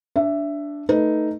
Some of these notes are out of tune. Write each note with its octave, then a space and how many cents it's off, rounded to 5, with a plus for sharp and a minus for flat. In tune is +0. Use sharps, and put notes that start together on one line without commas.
D4 -10 E5 +10
A3 +0 D#4 +0 B4 -5